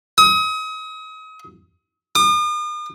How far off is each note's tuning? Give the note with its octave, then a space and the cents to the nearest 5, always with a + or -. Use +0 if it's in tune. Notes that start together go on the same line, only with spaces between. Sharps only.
D#6 +35
D#6 -45